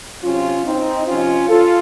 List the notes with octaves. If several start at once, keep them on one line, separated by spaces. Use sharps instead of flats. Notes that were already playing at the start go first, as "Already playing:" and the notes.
C3 F#3 C#4 F4
C4 D#4
C3 F3 C#4 F4
F4 A4